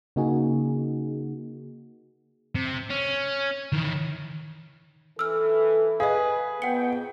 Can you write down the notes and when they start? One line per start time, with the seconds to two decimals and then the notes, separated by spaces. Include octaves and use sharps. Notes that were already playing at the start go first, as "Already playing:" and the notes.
0.16 C#3 A#3 D#4 F#4 G#4
2.55 C3
2.90 C#4
3.72 D#3 E3
5.19 E3 A4 E6 F6
6.00 G#4 B4 D#5 F5
6.62 F2 B3 F#5 G5 C#7